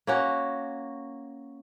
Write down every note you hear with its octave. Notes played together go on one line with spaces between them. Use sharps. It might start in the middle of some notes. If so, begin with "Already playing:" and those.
A#3 C#4 F#4